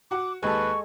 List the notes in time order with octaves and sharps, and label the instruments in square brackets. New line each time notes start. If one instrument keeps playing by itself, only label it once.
[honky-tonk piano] F#4 F#5 [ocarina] D6
[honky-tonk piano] D#2 [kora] G#3 A4 [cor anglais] B4 [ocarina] C#6